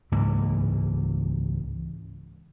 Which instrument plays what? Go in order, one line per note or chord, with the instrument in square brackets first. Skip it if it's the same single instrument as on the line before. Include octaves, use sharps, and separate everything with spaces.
[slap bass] C#2 G#2 E3 A#3